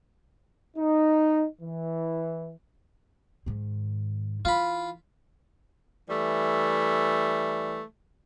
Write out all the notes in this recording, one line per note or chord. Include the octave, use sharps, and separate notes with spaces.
D#4
E3
G#2 D#3
E3 F4 B5
E3 G3 A3